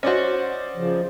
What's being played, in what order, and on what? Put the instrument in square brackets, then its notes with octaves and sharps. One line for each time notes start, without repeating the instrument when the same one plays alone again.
[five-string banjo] C#4 F#4 [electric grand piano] C5 D5 D#5
[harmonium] C#3 F3